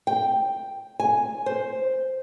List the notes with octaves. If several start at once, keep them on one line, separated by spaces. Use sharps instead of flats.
G5
G#5
C5